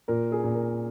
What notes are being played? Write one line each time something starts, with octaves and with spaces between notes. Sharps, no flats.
A#2 A#4
G#4
A#2
A#4